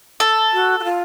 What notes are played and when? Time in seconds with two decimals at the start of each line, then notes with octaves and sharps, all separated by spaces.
0.20 A4
0.53 F#4
0.80 F#4
0.84 F4